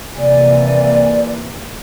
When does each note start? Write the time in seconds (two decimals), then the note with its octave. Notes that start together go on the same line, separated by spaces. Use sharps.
0.15 C3 E3 A#3 D5 G#5